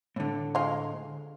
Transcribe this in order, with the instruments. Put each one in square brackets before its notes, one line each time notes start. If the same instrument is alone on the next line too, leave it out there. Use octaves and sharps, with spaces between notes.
[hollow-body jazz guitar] A2 D3
[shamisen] G#3 F4